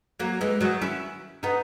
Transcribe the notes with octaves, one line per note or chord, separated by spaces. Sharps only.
F#3 A#3
E3 G#3
D#3 F#3
C#4 E4
B3 D#4